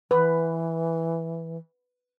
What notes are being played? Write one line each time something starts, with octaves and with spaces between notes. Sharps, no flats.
E3 B4